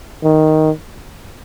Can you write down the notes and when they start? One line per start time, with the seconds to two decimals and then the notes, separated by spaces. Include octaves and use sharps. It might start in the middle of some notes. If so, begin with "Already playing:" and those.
0.24 D#3